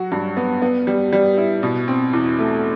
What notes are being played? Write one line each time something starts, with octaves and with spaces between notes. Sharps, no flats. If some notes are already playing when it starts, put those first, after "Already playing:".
Already playing: F#3 F#4
G2
B3
B3
G3
G3
E4
B2
C4
E2
A3